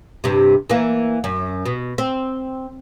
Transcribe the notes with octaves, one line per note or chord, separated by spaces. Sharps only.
G2 C3
E3 A#3
F#2
B2
C4